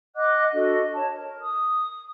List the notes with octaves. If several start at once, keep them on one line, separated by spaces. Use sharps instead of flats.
D#5 F#5 D6 F#6
D4 F#4 A4 D#5
C#5 D#5 A5
A#4
D#6